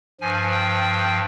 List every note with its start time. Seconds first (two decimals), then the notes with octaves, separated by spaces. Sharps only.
0.21 G2 F3 G#5
0.51 G5